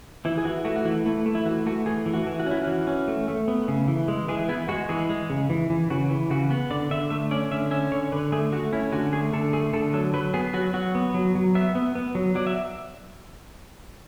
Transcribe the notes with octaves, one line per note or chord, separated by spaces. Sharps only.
E3 E4
G#4
E3 F#4
A3 F#4
F#4
E3 E4
A3 E4
A3
E4
E3 F#4
A3 F#4
E3 G#4
E3
F#4
E3
F#4
C#4 E4
F#4
E3
C#4
A3
A3
B3
C#3
E3
G#3
E3 G#4
B3 E4
G#3 F#4
E3 G#4
G#3
C#3
E3
E3
C#3 F#4
E3
C#3 F#4
B3
D3 D5
D3 E5
A3 E5
C#4 D5
D3 E5
C#4 E5
D3 C#5
D3 B4
A3 G#4
A3 F#4
C#4 E4
D3 F#4
A3 G#4
D3 A4
A3 G#4
D3 A4
F#3 A4
F#3 B4
B3 G#4
F#3 F#4
F#3 F#4
B3
F#3
F#3
B3 E5
B3
B3
F#3
F#3 D5
E5